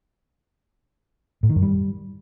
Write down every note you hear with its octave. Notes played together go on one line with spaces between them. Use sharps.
A2
D#3
F#2
G3